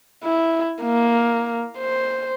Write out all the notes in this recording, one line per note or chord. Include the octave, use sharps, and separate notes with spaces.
E4
A#3
C5